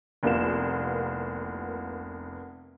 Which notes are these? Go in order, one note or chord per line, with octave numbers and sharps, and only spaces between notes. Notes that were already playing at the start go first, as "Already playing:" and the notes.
F1 C2 A#3 B3 F4 E7